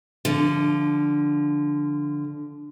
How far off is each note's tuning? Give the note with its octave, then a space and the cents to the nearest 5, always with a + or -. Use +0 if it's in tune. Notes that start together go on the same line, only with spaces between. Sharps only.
D3 +0 F3 -15